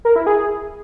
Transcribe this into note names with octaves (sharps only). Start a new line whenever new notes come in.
A#4
E4
G#4